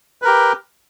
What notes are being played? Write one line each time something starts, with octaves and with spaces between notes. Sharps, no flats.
G4 A#4 B4